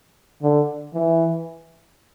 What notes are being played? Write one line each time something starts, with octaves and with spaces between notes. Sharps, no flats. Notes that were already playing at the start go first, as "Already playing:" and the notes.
D3
E3